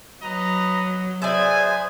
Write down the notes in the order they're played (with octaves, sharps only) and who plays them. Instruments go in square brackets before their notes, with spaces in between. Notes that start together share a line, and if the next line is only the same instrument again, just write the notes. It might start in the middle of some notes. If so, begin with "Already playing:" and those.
[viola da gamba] F#3 [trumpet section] B4 D#5 A#5
[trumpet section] B3 G#5 [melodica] G#4 C5 [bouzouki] D5 E5